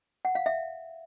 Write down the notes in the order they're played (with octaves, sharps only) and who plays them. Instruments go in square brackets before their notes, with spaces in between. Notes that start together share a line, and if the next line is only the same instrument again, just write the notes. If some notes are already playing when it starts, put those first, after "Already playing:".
[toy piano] F#5
F5
E5